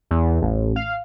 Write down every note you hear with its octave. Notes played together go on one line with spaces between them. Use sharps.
E2
A1
F5